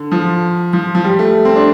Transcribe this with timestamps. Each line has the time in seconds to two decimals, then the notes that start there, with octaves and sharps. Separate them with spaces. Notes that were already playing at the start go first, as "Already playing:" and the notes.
Already playing: D3
0.11 F3
0.73 F3
0.95 F3
1.04 G3
1.19 A3
1.45 C4
1.56 D4